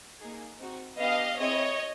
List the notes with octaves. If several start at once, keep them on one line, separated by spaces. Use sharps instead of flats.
A#3 D#4 G#4
C4 D#4 F#4
B3 D4 G4 D#5 F5
C4 E4 G#4 C#5 D#5